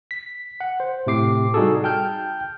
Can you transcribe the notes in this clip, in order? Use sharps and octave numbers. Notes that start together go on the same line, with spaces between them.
B6
F#5
C5
A2 C3 D6 C7
G3 D#4 F#4 G#4 A4
G5 A5 F6 G6